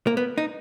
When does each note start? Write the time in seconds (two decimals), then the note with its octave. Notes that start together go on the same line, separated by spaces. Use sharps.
0.07 A#3
0.17 B3
0.38 D#4